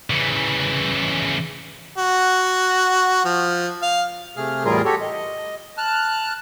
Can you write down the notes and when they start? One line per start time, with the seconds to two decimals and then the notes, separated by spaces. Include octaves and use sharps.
0.10 C#3 E3
1.98 F#4
3.25 F3
3.82 F5
4.36 C3 A3 G#4 F6
4.65 E2 A2 G3 F4 G#4 A#4
4.85 F#4 G4 A4 C#5
5.01 D#5
5.78 A5 F6 F#6